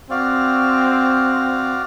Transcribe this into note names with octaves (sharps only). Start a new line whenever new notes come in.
C4 F#4 D5 F5